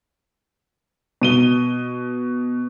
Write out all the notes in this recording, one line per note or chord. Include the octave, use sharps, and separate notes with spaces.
B2 D#7 G7